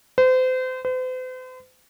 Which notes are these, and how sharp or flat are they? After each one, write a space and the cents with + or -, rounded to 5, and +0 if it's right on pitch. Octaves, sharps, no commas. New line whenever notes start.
C5 -35
C5 -45